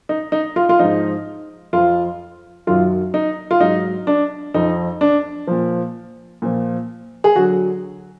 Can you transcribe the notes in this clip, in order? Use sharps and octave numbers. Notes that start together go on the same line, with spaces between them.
D#4
D#4
F4
F4
G#2 F3 D#4
F2 F3 F4
F#2 D#3 F#3 F4
D#4
F4
G#2 F#3 D#4
D4
F2 F3 D#4
D4
A#2 F3
A#2 F3
G#4
D3 F#3 F#4